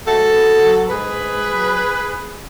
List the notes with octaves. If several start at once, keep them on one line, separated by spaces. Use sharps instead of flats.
G#2 F#4 A4
B3
F#3
G#2 G#4 B4
G#2
F#3